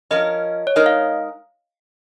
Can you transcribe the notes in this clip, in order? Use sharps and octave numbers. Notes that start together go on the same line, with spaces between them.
F3 C#4 A#4 D#5
C#5
G#3 D#4 A#4 D#5
F5